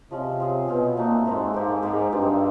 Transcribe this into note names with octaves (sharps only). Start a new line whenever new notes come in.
C3 F3 G#3 C#4
C4 F4 G#4
B2 C4 F4 G#4
A#2 A3 C4 D#4 F#4
G#2 A3 C4 D#4 F#4
G#2 A#3 D#4 G4
G#2 A#3 D#4 G4
G2 G#3 C4 F4